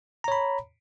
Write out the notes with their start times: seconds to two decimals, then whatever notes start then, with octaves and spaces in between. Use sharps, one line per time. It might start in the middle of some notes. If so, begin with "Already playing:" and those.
0.24 A#5
0.28 C#5
0.32 B5